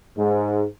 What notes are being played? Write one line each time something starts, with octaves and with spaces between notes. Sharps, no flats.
G#2